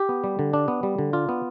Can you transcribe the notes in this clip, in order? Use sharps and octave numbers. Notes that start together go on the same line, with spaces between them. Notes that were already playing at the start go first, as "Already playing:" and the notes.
Already playing: G4
B3
G3
D3
D4
B3
G3
D3
D4 F4
B3